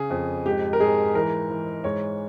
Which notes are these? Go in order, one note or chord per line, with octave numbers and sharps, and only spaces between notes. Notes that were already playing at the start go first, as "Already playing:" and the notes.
Already playing: C#3 G#4
F2
G#2 G4
A#4
G#2 G#4
E3 A#4
E3
G#2 C#5